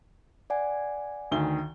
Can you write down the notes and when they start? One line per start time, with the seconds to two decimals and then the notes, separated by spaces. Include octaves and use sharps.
0.50 D5 F#5 G#5
1.31 D2 D#3 G7